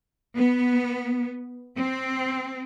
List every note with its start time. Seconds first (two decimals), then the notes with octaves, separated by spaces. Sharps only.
0.36 B3
1.78 C4